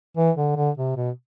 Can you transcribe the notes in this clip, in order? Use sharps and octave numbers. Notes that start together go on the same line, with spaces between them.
E3
D3
D3
C3
B2